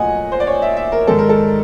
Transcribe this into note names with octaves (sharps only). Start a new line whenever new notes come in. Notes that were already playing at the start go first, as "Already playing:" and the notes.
Already playing: A#2 F#3 A3 D#5 F#5 G#5
C5
D5
C#5
E5
E5
A#4
G#2 D#3 G#3 A4
A#4
A4